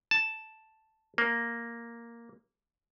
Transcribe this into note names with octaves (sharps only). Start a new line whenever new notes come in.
A5
A#3